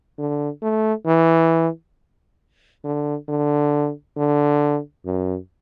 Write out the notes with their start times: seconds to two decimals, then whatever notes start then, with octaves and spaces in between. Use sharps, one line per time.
0.18 D3
0.62 A3
1.06 E3
2.84 D3
3.28 D3
4.17 D3
5.05 F#2